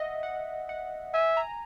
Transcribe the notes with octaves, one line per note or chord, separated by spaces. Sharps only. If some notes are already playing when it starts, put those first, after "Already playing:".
Already playing: D#5 E5 F#5
F#5
F#5
E5 G#5
A#5